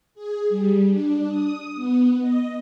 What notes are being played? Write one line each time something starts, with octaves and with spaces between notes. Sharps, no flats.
G#4
G3
D4
D#6
B3
D#5